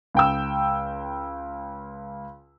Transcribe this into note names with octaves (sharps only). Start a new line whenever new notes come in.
C#2 G5 E6